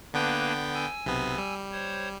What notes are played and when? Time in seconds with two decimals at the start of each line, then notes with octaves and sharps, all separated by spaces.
0.14 D3 A#3 B3 D4 B4 G5
0.74 G#5 E6
1.05 B1 C3 B3
1.38 G3
1.72 C5 C#5